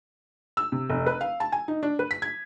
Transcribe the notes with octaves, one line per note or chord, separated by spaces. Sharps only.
E6
C3
F1
B4
F5
A5
G#5
D#4
D4
B4
B6
G#6